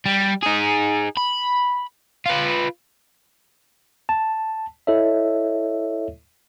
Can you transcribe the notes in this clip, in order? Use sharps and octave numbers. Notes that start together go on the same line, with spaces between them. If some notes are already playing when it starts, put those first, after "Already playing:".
G3
D#4 G#4
B5
F4 B4
A5
E4 A4 C#5 D#5 E5